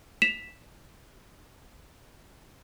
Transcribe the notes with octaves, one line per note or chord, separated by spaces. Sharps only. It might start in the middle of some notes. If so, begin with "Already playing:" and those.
B6 E7 F7